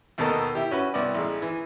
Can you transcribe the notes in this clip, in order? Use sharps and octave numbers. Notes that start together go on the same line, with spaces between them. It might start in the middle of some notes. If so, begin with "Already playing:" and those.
D#2 B2 A#3 A4 A#4 D#5
E4 G4
C#4 F#4 B4
C2 B3 D5
A1 G#3
E3